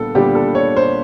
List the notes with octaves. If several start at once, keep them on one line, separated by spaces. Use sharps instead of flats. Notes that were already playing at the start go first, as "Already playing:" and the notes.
Already playing: A#2 G3 B3 D4 A4
A#2 G3 B3 D4 G4
A4
C#5
C5